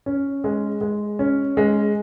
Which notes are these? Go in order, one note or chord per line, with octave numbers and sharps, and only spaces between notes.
C#4
G#3
G#3
C#4
G#3